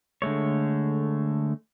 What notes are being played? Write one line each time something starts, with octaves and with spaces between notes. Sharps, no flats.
D3 G#3 A3 C#5